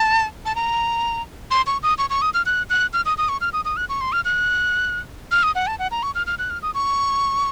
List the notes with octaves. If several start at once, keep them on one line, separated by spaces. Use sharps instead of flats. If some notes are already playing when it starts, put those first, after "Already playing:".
Already playing: A5
A5
A#5
C6
C#6
D#6
C#6
C#6
D#6
F6
F#6
F#6
F6
D#6
D#6
C#6
F6
D#6
D#6
F#6
C#6
C6
F6
F#6
F6
D#6
F#5
A5
F#5
A#5
C#6
F6
F6
F#6
F6
D#6
C#6